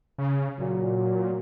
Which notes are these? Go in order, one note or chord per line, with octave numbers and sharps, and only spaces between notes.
C#3
A#2 F#3